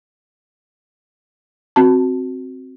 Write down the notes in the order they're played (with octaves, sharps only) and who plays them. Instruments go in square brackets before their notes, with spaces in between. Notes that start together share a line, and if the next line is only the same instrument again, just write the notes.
[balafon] C4 F#4 A5